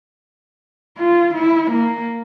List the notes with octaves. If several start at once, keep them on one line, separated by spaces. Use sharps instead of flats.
F4
E4
A#3